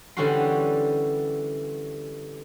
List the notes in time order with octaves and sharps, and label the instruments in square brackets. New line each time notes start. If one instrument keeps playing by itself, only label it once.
[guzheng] D3 E3 G3 C#4 F#4 C6